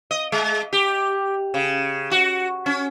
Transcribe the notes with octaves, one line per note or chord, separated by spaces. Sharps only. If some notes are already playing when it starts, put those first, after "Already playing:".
D#5
G#3
G4
C#3
F#4
C#4